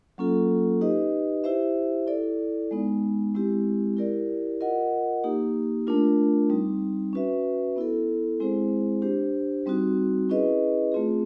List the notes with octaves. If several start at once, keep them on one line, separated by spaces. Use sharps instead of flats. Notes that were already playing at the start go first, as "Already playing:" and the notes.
F#3 A#3 C#4 F4 A4
D#4 G4 B4 D#5
E4 G4 C5 E5
E4 A4 D5
G#3 B3 D#4
G#3 C4 E4 G4
E4 G4 A#4 D5
F4 A#4 D#5 F#5
A#3 D#4 G4
A3 D4 F4 A#4
G3 C4 D#4
C#4 F#4 B4 E5
B3 E4 A4
G#3 C4 E4 G#4 C5
D4 G4 C5
G3 C4 D#4 F#4
C#4 E4 G#4 B4 D#5
A3 C4 F4 G#4